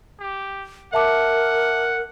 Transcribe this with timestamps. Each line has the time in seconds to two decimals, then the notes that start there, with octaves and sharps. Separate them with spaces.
0.20 G4
0.94 A#4 E5 F#5 A5 D6